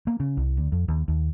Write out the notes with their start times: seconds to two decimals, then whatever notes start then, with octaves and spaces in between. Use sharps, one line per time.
0.07 A#3
0.20 C#3
0.37 C2
0.57 D2
0.72 F2
0.88 D#2
1.08 D#2